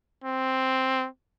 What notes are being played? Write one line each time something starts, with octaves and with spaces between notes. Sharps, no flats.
C4